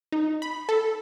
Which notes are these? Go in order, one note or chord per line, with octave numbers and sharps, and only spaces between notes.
D#4
B5
A4